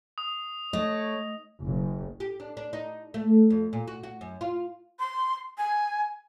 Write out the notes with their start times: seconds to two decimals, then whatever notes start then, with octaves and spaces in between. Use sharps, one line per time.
0.18 D#6
0.73 A3 C#5 D#5
1.61 F#1
2.20 G4
2.40 D4
2.57 D4
2.73 D#4
3.14 A3
3.50 F2
3.73 A#2
3.88 F#4
4.03 F#4
4.21 F#2
4.41 F4
4.99 C6
5.58 G#5